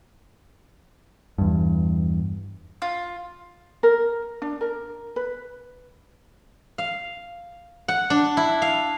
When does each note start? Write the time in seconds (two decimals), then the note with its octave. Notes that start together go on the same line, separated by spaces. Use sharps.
1.38 E2 G2
2.82 F4
3.83 A#4
4.42 D4
4.61 A#4
5.16 B4
6.78 F5
7.88 F#5
8.10 D4
8.37 E4
8.62 F5